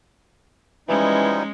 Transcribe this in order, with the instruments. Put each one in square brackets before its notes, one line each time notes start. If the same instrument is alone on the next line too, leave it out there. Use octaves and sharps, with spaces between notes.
[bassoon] E3 [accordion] F3 G3 D#4 [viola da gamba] G#3 C#4